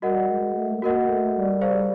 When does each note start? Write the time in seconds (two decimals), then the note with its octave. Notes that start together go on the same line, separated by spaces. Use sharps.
0.02 G3 F#4 A#4 D#5 F#5
0.29 G#3
0.56 A3
0.77 A3
0.82 A#3 F#4 A#4 D#5 F#5
1.08 A3
1.36 G3
1.61 G#4 C5 F5